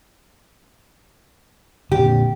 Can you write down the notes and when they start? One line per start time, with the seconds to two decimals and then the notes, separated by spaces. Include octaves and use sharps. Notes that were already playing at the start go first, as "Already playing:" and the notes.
1.92 A#2 D3 G4